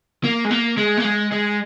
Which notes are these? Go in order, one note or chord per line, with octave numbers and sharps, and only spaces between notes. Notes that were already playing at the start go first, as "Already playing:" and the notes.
A#3
G#3
A#3
G#3
A#3
G#3
G#3